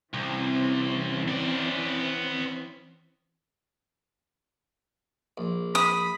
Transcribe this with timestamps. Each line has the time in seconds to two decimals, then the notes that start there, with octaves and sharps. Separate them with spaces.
0.14 C2 E3 C4 C#4
1.28 B3 D5
5.38 A#1
5.75 B5 D#6